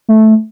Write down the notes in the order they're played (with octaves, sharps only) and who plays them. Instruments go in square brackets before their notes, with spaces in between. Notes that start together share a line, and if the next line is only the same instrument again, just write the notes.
[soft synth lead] A3